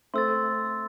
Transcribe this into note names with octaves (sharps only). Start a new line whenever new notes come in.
A3 C4 C6 E6 A6